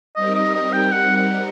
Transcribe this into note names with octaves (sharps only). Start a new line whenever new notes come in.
G3 C4 D#4 G4 A#4 D#5
D#5
D#5
G5
F#5
F#5